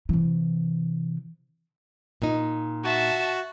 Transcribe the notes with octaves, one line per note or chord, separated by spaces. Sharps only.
C3 E3
A#2 D#4
F#4 E5 A5